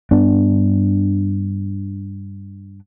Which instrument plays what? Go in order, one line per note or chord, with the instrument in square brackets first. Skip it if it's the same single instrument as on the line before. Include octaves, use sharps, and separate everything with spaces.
[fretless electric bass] G2 B3 D4